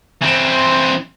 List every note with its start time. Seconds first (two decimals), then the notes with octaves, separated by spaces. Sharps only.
0.21 E3 C4